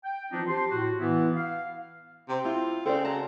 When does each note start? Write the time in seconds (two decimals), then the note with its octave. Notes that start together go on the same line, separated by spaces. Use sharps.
0.05 G5
0.32 E3 F3 C4 D4 D#4 F4
0.48 G4 C5 A5 C6
0.71 A2 F#4
0.99 E3 B3 E4
1.35 F5
2.29 C3 C4
2.44 E4 F4
2.85 C#3 C4 A4 D5
3.05 F#4 A5 A#5